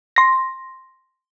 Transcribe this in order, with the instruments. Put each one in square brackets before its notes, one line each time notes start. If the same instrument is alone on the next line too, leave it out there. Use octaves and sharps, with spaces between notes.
[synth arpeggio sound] C6 A#6